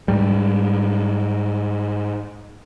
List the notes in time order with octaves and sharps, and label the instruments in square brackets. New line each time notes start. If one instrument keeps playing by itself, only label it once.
[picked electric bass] G#2 G3